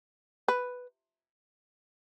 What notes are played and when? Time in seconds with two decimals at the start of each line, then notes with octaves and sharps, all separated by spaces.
0.48 B4